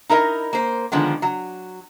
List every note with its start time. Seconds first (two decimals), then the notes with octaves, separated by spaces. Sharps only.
0.09 D#4 E4 A#4 D#5
0.53 A#3 C5
0.92 D3 D#3 F3 G#3 B3
1.22 F#3